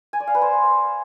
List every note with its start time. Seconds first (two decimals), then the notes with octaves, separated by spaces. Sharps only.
0.13 G#5
0.20 D5
0.27 F5
0.35 B4
0.42 C5